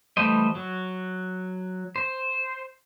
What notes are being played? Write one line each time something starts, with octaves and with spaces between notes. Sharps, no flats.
E3 G3 A3 C5 D#5
F#3
C5